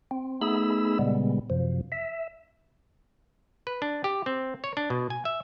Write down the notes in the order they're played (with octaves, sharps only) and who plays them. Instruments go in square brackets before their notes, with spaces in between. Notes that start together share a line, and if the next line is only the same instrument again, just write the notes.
[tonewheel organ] C4
A3 B3 D#4 G#4 B5 E6
A#2 C#3 G3 G#3 B3
F#2 C3 F3
E5
[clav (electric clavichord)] B4
D4
G4
C4
C#5
D4
B2
G#5
E5